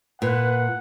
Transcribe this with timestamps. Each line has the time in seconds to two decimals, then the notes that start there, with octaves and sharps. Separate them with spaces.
0.22 A#2 B4 F#5